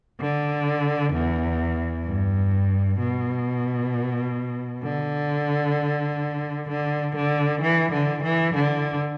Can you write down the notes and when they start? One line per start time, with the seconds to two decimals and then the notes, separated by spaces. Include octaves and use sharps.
0.20 D3
1.13 E2
2.05 G2
2.98 B2
4.84 D3
6.69 D3
7.16 D3
7.61 E3
7.92 D3
8.23 E3
8.54 D3